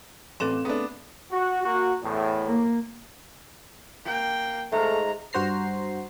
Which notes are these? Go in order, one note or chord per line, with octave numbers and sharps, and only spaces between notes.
A1 C4 A4 B4 C6 E7
A3 B3 D4 G#4
F#4
A#3 F#4
E2 A2
A#3
A#3 G5
G#2 A3 F4 A#5
G2 F#4 C5 A#5 C7